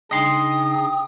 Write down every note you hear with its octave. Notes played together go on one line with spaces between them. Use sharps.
C#3 D4 D#4 D#5 G5 C6 D#6